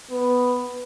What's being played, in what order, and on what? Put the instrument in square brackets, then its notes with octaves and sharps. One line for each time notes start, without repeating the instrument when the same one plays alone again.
[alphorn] B3